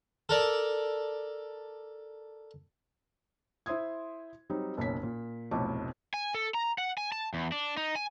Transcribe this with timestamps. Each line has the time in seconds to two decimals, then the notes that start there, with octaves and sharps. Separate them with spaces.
0.29 A4 A#4 D5
3.66 E4 C5 E5 C6 D#6 G#6
4.50 F#3 G3 C4 D#4
4.77 F#1 B1 C#5 B6
5.03 A#2
5.51 F1 B1 F2 A2 C#6 D6
6.14 G#5
6.34 A4
6.54 A#5
6.78 F#5
6.98 G#5
7.12 A5
7.34 E2
7.52 D4
7.77 D#4
7.95 G#5